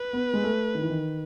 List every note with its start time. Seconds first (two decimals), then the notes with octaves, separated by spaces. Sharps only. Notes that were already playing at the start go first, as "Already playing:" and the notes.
Already playing: B4
0.13 B3
0.34 G#3
0.44 A3
0.75 D#3
0.82 E3
0.90 D#3